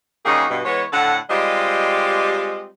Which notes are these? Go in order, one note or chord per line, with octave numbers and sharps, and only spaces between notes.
C#3 G3 A#3 D#4 F#4 G#4
G2 B2
E3 G#3 B3 C#5
A2 D3 A4 F#5
G3 G#3 C4 F4 G4 D#5